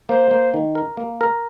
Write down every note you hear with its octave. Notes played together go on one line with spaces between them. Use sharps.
A#3 C5
A#3
D#3
A#4
A#3
A#4